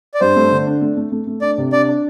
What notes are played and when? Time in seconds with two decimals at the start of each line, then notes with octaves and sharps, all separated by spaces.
0.14 D5
0.21 G2 C5
0.36 A3
0.51 D3
0.66 D4
0.81 A3
0.97 A3
1.12 A3
1.27 A3
1.42 D4 D5
1.58 C3
1.73 D4 D5
1.88 D4